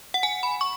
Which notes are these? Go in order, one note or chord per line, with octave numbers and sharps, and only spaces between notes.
F#5
G#5
B5
C#6